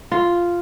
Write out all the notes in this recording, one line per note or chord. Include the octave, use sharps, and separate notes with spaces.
F4